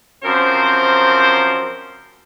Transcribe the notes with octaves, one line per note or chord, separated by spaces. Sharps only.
F#2 F3 C4 A#4 C5